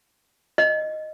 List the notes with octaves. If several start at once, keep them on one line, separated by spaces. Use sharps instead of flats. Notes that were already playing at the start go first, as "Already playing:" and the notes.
D#5